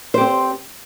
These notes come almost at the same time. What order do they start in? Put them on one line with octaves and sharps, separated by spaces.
C5 G4 C4